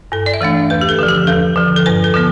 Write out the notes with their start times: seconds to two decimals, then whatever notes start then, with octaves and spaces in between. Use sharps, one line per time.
0.12 G2 A4
0.26 D5
0.34 E5
0.41 E3 A3 D4 F5
0.70 E2 B4
0.81 G4
0.89 A4
0.99 D3 F3
1.08 G4
1.27 E2 A4
1.56 D3 F3
1.76 A4
1.86 G2 B4
2.04 A4
2.14 D3 F3 B3